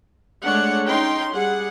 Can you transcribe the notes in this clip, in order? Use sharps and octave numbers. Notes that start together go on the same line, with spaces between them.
G#3 A3 D4 C#5 F#5
C#4 D#4 G5 C6
G3 G#4 F#5